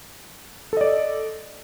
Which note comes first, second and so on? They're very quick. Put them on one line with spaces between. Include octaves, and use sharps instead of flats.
A4 D#5 D5